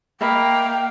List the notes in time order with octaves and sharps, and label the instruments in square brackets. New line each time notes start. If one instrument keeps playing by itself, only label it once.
[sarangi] A#3 [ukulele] D#5 E5 B5 [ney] G5